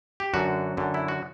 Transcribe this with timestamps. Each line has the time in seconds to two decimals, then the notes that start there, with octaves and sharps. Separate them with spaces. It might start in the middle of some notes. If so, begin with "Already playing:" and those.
0.20 G4
0.34 F#2 D3 F#4
0.77 F#2 D3
0.94 E4
1.08 F#4